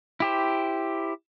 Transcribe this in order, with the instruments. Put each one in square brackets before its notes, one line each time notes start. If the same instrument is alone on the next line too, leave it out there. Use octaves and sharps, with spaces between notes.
[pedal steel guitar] E4 G4 C5